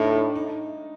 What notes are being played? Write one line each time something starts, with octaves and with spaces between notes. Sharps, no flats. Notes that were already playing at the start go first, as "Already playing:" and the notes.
Already playing: A2 D4 D#4
D#4